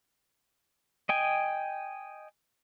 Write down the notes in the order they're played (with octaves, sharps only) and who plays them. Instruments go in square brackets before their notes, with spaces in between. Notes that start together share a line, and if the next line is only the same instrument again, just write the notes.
[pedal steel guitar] D#5 G5 G#5